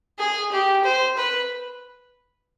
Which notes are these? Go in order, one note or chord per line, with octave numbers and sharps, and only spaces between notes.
G#4
G4
C5
B4